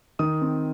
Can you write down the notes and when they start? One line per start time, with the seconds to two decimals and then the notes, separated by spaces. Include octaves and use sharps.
0.19 D#3 D#6
0.42 C4